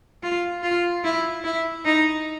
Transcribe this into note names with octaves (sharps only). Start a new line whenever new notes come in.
F4
F4
E4
E4
D#4